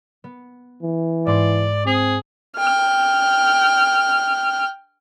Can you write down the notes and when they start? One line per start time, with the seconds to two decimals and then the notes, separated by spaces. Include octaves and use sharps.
0.24 B3
0.83 E3
1.27 G#2 D5 A5 C6
1.86 C4 G#4
2.57 G5 F6